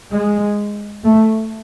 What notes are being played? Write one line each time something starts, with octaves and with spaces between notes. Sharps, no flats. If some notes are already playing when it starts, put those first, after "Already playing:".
G#3
A3